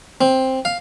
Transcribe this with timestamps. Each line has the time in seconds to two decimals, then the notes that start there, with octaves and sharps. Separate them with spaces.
0.21 C4
0.65 F5